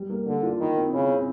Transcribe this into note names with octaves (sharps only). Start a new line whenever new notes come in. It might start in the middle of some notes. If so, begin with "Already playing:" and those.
Already playing: G3
A#3
D3 A#3
F4
D#3 E4
C4
C#3 E4
C4